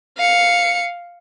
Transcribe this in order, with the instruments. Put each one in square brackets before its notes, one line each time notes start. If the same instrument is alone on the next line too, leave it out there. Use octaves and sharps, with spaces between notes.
[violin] F5 C#7